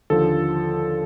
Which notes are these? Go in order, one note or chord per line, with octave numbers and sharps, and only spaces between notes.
D#2 D3 F3 A4